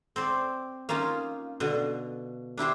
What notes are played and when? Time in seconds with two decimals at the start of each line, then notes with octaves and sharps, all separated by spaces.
0.16 C4 C5 D5
0.89 A#3 C#4 D#4 F4
1.60 B2 D3
2.57 D4 E4 G4 C5